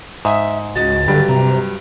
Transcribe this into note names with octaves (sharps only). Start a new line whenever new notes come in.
G#2 E5 D#6
C#2 F#4 D#5 A6
G2 D3 F#3 G4
C3 A#5